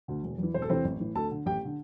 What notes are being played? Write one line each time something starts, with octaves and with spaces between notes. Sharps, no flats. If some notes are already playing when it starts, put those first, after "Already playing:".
D2 D3
E1
E2 E3
E1 C5
A4
E2 C3 E3 C4 C5
A1
A2 E3
D2 A4 A5
D3
A1 G4 G5
D3